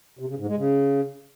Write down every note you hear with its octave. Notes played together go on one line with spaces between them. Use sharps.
C3
C#3
G#2
G#3
C#3